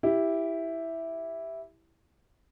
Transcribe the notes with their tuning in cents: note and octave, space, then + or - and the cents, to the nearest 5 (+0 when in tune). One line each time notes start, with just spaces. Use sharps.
E4 +0 G4 +0